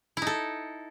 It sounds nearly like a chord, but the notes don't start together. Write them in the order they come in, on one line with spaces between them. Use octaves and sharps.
E4 D#4 A4